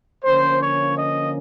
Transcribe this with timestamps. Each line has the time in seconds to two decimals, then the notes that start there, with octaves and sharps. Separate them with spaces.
0.25 D3 F3 A#3 C#4 C5
0.61 C#5
0.97 D#5